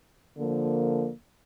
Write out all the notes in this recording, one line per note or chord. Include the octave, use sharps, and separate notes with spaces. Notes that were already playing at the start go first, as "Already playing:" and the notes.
D3 F3 A#3